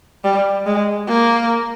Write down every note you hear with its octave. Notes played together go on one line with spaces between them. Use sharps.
G3
G#3
A#3